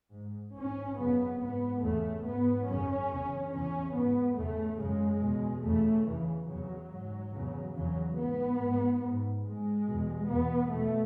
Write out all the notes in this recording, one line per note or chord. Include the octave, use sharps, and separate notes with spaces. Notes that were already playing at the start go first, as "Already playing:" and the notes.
G#2
G#2 C#4
F#2 C#3 B3
G#2 B3
E2 C#3 A3
G#2 B3
F#2 C#3 C#4
E2 C#3
E2 C#3 C#4
G#2 B3
E2 C#3 A3
F#2 C#3 G#3
E2 B2
E2 C#3 A3
E2 C#3 E3
E2 C#3 F#3
G#2
E2 C#3
E2 C#3 F#3
G#2 B3
G#2
G#2
G#2 G#3
E2 B2
E2 B2 B3
E2 B2 A3